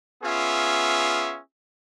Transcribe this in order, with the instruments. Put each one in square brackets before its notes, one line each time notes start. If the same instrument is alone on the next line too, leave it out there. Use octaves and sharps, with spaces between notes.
[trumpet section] B3 C#4 F4 G#4 E5